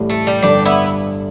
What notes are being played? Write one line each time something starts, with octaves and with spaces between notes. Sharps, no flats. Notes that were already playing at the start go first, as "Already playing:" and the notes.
Already playing: A1 A2 G3
A3
G3
G1 G2 D3 D4 G4
B3 E4